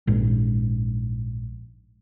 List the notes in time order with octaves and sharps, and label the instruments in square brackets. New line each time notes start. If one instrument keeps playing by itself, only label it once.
[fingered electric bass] A#1 G#2